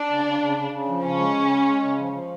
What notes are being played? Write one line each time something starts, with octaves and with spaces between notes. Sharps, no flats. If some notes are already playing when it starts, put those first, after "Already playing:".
Already playing: D4
C#3
C#3
C#3
C#3
C#3
F3
C#3 C#4
G#3
C#3
G#3
G#3
C#3
F3
F3